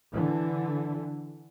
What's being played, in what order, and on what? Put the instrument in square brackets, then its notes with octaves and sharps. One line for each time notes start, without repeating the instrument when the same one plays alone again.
[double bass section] D3 E3